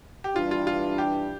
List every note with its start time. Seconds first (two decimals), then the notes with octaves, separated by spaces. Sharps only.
0.24 G4
0.36 G2 E3 G3 D4 F4
0.51 F4
0.67 F4
0.98 G4